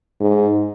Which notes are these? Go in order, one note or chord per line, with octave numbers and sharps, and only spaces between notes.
G#2